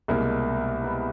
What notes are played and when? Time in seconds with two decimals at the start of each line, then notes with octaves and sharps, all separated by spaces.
0.08 C2 B2 G#3 A#3
0.84 B3